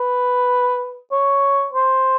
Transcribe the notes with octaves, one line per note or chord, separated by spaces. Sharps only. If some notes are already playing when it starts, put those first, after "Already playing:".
Already playing: B4
C#5
C5